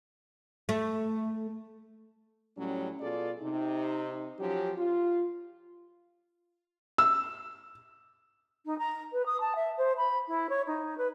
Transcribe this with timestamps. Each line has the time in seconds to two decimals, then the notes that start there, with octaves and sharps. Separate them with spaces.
0.69 A3
2.57 A2 F#3 G3 C#4
3.00 B2 F4 G#4 A4 D5
3.41 C3 D#4
4.39 F3 F#3 C#4 G4
4.76 F4
6.98 E6
8.65 D#4
8.78 A#5
9.12 B4
9.26 D#6
9.40 A5
9.55 E5
9.77 C5
9.97 B5
10.27 E4
10.49 C#5
10.67 D#4
10.97 B4